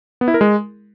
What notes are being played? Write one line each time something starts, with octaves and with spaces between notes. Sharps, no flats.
B3
E4
A#4
G#3